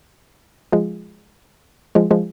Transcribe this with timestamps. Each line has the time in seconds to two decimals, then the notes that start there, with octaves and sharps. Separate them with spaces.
0.72 F3 G#3
1.95 F3 G#3
2.11 F3 G#3